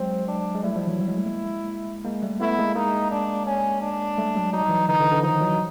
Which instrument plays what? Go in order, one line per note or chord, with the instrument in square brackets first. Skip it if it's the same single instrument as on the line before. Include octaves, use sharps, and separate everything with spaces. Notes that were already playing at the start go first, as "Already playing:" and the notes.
Already playing: [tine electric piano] F#3 G#3 [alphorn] C4
[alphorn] D4
[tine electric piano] G#3
[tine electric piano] G3 A3 [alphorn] E4
[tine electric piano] F3 G3
E3 F#3
F3 G3
F#3 G#3
G3 A3
G#3 A#3
G#3 A#3
G3 A3
[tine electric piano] A3 B3 [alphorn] E4
[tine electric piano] G#3 A#3
[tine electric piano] G#3 A#3 [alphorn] D#4
[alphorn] D4
C#4
D4
[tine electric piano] G3 A3
F#3 G#3
[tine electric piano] F#3 [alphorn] D#4
[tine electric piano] G3
E3 F#3
[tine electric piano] D3 E3 [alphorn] D#4
[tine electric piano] D3 E3
D3 E3
[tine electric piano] D#3 F3 [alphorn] D#4
[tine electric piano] E3 F#3